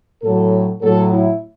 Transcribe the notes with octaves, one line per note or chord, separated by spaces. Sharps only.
A2 F#3 A4
A2 F#3 A4
E4